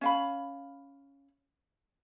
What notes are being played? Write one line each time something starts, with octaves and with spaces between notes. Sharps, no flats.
C#4 F5 B5